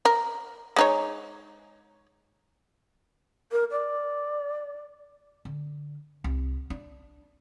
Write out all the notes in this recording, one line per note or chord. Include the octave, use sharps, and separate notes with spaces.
A#4
G#3 D#4 C#5
A#4
D5
D3
C2
D4